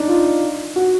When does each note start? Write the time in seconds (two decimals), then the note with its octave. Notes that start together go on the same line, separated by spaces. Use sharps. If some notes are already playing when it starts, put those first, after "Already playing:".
Already playing: D4 D#4
0.08 F4
0.76 F#4